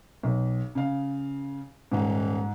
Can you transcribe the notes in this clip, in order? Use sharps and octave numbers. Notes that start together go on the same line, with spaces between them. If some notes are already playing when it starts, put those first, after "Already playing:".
B1
C#3 F5
D#1 G#2